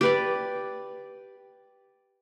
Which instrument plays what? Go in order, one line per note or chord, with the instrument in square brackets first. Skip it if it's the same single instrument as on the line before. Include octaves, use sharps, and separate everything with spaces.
[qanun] G4 B4 D5